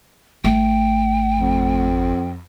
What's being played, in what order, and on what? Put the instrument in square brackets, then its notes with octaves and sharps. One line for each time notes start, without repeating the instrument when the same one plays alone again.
[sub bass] G#1 [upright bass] A3 [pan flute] G5
[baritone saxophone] F2